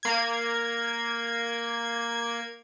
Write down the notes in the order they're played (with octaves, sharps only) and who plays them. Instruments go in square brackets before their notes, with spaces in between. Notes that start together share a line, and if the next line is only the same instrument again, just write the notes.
[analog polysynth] A#3 G#6